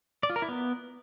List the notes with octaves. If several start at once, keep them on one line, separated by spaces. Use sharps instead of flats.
D5
F4
A#4
E4
B3